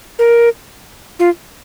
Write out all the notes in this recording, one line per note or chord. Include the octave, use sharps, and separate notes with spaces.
A#4
F4